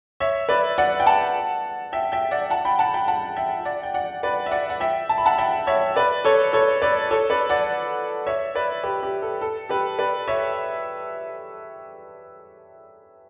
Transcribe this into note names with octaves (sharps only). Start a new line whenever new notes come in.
C#5 E5
B4 D5
D5 F#5
G5
F#5 A5
E5 G5
E5 G5
D5 F#5
F#5 A5
G5 B5
F#5 A5
G5 B5
F#5 A5
E5 G5
D5 F#5
G5
D5 F#5
B4 D5
E5
D5 F#5
F#5
E5 G5
A5
B5
F#5 A5
E5 G5
C#5 E5
B4 D5
A4 C#5
A4 C#5
B4 D5
A4 C#5
B4 D5
D5 F#5
C#5 E5
B4 D5
G4 B4
G4
A4
A4
G4 B4
B4 D5
C#5 E5